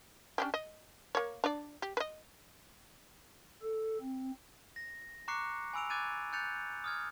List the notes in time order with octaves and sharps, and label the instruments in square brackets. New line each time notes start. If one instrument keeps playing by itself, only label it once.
[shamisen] C#4 D4 G4
D#5
A#3 C#5
D4 D5
G4
B4 D#5
[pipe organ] A4
C4
[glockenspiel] A#6
A#5 C#6 D6 F#6 C7 C#7
G#5 B5 E6 D7 F7
D6 F#6 G#6 A6 D#7
F#6 G6 A6 C#7 F7
D#6 F6 G#6